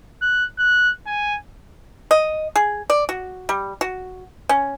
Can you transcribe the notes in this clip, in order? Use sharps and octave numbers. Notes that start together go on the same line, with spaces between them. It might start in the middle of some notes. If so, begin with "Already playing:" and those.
F#6
F#6
G#5
D#5
G#4
D5
F#4
G3
F#4
C#4